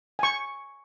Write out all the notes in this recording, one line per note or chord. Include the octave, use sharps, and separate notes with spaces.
G#5 C#6